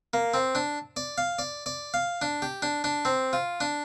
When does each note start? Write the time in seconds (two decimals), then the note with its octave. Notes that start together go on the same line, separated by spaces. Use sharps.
0.14 A#3
0.34 C4
0.55 D4
0.97 D5
1.18 F5
1.39 D5
1.66 D5
1.94 F5
2.22 D4
2.42 G4
2.62 D4
2.84 D4
3.05 C4
3.33 F4
3.61 D4